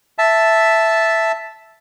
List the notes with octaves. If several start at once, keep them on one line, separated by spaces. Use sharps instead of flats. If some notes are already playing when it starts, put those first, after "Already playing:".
E5 A5